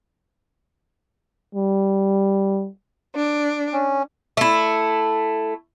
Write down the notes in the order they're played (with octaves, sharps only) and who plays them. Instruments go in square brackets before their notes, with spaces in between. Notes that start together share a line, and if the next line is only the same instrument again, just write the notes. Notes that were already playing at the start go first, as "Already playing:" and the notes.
[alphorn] G3
[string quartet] D4
[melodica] C#4
[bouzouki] A3 E4